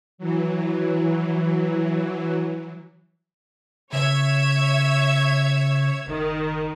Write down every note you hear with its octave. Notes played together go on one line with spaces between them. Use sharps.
E3 F#3
C#3 C#5 E5 G#6
F#1 D#3